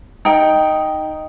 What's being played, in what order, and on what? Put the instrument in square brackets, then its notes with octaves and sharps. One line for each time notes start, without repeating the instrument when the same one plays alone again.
[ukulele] D#4 G5